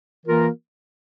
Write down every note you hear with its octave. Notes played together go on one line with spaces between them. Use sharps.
E3 A#3 F4 A#4